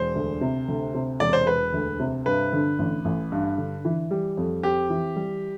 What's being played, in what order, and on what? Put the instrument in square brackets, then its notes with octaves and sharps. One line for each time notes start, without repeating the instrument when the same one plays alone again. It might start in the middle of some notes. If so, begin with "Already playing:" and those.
Already playing: [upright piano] E1 [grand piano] C5
[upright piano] D2
C3
D2
C3
[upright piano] E1 [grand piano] D5
[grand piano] C5
[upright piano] E1 [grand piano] B4
[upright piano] D2
C3
[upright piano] G2 [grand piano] B4
[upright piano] D3
A1
A1
G2
D3
E3
G3
F2
[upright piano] C4 [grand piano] G4
[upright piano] E3
G3